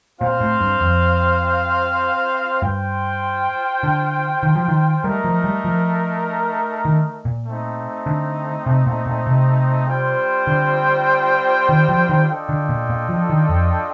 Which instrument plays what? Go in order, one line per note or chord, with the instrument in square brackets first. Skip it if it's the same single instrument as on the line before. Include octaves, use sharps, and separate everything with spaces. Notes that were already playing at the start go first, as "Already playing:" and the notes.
[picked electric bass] A#2 [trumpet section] C4 F4 C5 F5
[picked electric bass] A2
G2
F2
[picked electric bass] G2 [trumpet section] F4 C5 G5
[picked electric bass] D3
D#3
F3
D#3
[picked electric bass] G3 [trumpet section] A3 D#4 A#4
[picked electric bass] F3
G3
F3
D#3
A#2
[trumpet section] A3 C4 D#4
[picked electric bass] D3
C3
A#2
A#2
C3
[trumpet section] G3 C4 F4 C5 G5
[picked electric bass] D3
D#3
F3
D#3
[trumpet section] D4 F4 A4 D#5 G5
[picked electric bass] D3
A#2
A#2
F3
D#3
F2